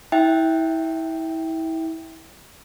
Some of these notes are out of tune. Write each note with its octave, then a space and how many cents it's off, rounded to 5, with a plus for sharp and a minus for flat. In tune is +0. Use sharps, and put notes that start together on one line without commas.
E4 -30 E5 +0 G5 +0